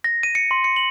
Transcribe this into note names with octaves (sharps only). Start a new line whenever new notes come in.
A#6
D#7
C#7
C6
C#7
F#7